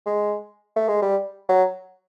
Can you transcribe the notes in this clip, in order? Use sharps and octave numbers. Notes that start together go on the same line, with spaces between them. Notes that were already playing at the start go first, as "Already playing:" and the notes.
G#3
A3
G#3
G3
F#3